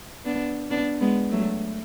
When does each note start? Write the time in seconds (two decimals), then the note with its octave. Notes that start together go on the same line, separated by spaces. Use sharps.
0.25 B3 D4
0.71 B3 D4
1.01 G#3 B3
1.31 F#3 A3